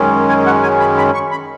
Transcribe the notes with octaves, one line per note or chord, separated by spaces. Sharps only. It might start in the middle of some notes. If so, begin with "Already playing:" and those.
Already playing: F#2 D#3 G#3 C#4
G#5
F#5
G#5
B5
B5
C#6
B5